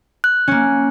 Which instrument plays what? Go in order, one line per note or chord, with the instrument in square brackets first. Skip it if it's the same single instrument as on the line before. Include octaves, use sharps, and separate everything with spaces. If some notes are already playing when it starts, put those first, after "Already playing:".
[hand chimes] F#6
[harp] A#3 C#4